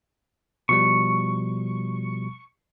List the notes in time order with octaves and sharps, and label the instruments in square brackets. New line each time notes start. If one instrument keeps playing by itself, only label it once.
[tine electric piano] B2 F3 G3 [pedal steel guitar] C#6